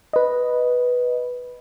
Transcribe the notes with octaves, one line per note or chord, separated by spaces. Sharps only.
B4 D#5